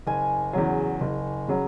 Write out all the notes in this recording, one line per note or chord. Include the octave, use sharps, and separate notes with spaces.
F#1 G#5
E2 C#3 F#3
F#1
C#3 F#3